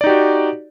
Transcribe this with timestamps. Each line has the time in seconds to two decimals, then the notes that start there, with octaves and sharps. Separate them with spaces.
0.01 D5
0.04 D#4
0.07 G4
0.09 F#4